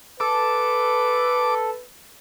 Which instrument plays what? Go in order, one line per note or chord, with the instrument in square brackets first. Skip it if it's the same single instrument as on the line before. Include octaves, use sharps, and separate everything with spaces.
[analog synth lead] A4 [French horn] B4 [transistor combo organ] D6